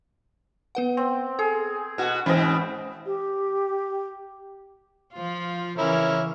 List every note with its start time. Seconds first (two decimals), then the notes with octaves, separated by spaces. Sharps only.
0.75 B3 B4 F#5
0.97 C4
1.39 G#4 A4
1.98 B2 F#4
2.26 G#2 B2 E3 C4 C#4 B4 D#5
3.06 G4
5.13 F3 F4
5.78 C#3 E3 C#4 E4 A#4